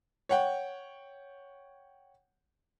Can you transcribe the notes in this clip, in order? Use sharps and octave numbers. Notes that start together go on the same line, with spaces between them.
C#5 F#5 G5